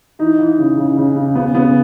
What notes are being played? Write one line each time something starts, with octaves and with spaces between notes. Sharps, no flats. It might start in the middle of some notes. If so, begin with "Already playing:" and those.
E3 D#4
E3
C#3
C#3
C#3
C#3
C#3 B3
C#3 B3